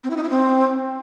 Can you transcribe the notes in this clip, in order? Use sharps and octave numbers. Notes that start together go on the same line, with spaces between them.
C4
E4
D#4
E4
C4